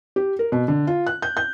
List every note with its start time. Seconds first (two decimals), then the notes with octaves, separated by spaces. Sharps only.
0.16 G4
0.39 A#4
0.52 B2
0.68 D3
0.87 F4
1.07 F#6
1.22 G6
1.37 G6